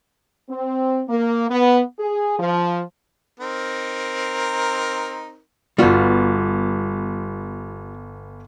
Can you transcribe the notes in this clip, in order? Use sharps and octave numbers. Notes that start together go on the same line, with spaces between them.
C4
A#3
B3
G#4
F3
C4 D#4 A#4
G1 G3 B3 F4 F#4